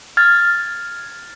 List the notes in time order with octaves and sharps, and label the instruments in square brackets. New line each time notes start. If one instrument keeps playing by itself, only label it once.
[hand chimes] F6 G#6 A6